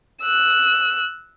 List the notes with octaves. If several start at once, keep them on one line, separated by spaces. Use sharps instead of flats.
E6 F#6